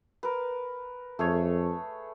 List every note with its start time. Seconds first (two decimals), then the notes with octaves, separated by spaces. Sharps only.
0.23 A#4 B4
1.19 F2 A3 G#4 C#5